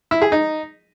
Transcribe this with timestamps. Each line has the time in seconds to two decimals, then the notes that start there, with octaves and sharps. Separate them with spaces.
0.11 E4
0.22 G#4
0.32 D#4